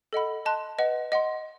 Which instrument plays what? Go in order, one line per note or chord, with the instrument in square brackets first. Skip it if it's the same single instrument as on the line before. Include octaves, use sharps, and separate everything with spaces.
[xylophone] A4 D#5 F#5 B5
D#5 A5 C6 F#6
B4 D#5 F#5
D#5 F#5 C6